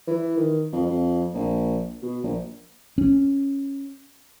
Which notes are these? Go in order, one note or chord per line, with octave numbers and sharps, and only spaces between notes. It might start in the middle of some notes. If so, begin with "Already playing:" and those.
E3
D#3
F2
F2
A#1
B2
A#1
C#4